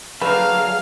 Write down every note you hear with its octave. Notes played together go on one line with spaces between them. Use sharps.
D3 F#3 A3 A#3 G#4 B4 F5 F6